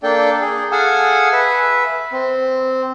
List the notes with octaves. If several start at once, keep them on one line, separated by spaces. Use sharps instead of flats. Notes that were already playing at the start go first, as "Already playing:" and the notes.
A#3 D4 A4 D5 G5
G#4
G#4 A4 F5 F#5 G#5 E6
B4 E5
C4